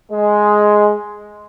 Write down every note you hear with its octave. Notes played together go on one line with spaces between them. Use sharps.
G#3